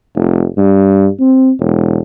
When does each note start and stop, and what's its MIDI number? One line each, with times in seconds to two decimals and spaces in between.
0.15 0.45 29
0.57 1.07 43
1.20 1.51 60
1.60 1.98 28